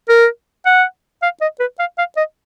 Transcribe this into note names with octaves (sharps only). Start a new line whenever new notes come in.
A#4
F#5
F5
D#5
B4
F5
F5
D#5